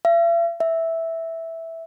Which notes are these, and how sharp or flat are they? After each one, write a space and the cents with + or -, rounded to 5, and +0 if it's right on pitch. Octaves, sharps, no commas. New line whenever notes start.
E5 +45
E5 -5